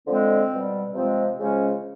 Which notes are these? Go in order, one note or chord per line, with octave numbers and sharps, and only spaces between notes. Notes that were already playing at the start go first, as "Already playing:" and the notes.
D3 F3 G#3 C4
B2 G3
C3 F3 G#3 C4
C#3 F3 G#3 C#4